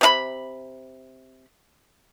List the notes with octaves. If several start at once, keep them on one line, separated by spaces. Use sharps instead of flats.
C3 D#4 B5